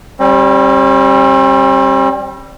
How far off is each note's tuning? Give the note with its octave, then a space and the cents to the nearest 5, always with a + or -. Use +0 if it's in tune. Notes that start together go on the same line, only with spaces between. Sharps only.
G3 +0 C4 +45